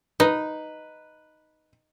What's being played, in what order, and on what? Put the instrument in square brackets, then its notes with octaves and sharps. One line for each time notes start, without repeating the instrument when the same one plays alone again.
[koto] D#4 [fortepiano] B4